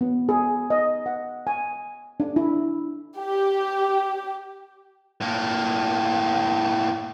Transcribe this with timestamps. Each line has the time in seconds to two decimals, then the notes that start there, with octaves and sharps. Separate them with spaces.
0.01 B3
0.29 G#4
0.70 D#5
1.06 F#5
1.47 G#5
2.20 D4
2.36 E4
3.16 G4
5.21 A2 A#3